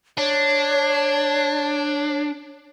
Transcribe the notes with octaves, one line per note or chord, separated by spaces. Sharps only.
D4 C#5